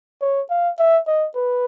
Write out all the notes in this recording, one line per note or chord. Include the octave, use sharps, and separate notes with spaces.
C#5
F5
E5
D#5
B4